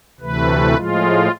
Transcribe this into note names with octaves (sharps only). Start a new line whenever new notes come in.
D2 C3 E3 A3 B4
A2 F3 G#3 F4